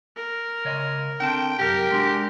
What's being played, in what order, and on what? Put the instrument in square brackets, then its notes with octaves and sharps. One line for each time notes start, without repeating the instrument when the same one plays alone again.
[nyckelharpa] A#4
[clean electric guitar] C#3 C#5 D#5
[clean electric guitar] D3 C4 A5 [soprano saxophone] G5
[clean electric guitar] C2 F#2 [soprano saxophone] G4 [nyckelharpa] A#4
[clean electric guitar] G#3 D4 F#4